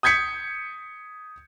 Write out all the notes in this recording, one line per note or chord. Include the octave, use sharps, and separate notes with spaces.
D#6 G6 G#6 B6 C#7